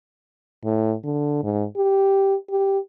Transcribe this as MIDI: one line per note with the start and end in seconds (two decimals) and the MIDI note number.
0.64 0.95 45
1.04 1.39 50
1.44 1.65 44
1.77 2.35 67
2.50 2.79 67